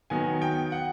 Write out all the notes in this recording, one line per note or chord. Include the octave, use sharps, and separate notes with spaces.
D#3 F#3 B3 G#5
G5
F#5